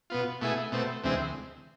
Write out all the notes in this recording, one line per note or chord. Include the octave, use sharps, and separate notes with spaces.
B2 B3 F4
B2 A3 E4 G#4
B2 A3 C4
D2 C3 E3 G#3 C4